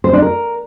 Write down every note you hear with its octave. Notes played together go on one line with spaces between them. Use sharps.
C5
D4
A#4